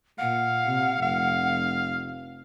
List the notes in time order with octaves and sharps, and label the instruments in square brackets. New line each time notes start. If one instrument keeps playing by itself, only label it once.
[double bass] A#2 [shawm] F5 [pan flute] F#5
[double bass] C3
[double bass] F1 [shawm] F5